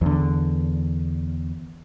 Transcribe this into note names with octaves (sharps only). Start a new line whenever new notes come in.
E2 D3